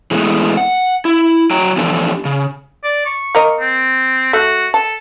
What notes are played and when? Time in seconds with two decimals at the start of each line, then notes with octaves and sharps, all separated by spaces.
0.11 E3 G#3 A3 B3
0.57 F#5
1.05 E4
1.51 F#3 G5 A#5
1.77 E3 F3 B3 D4 G4 A4
2.25 C#3
2.84 D5
3.06 C#6
3.35 A#3 A#4 D#5
3.61 C4
4.33 A3 F#4
4.74 A4 A5